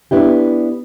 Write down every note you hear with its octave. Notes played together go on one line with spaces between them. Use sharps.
B3 D4 E4 G4